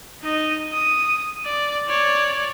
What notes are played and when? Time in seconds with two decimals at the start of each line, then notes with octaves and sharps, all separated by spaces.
0.23 D#4 D#5
0.72 D#6
1.46 D5
1.88 C#5 D5